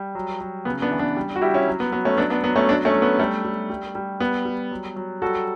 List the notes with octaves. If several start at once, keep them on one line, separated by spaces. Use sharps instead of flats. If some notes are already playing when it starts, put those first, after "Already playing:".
Already playing: G3
F#3
F#3
C#3 B3
B3 D4
E3
B3 D4
G3
F#4
G3 E4 G4
C#4 E4
F#3
B3
F#3 B3
A3 C#4
F#3 B3 D4
B3 D4
F#3 B3
A3 C#4
F#3 B3 D4
A3 C#4
F#3
B3
G3 A3
G3
G3
G3
G3 B3
G3
F#3
F#3
G3 F#4 A4